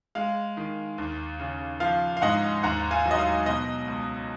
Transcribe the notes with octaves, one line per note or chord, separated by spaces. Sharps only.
G#3 F5
D#3
D#2
C#3
F3 F5
F5
G#2 D#5 F#5
D#2 F#5 A#5
F5 G#5
F#3
D#5
F5
B2 D#5
C#2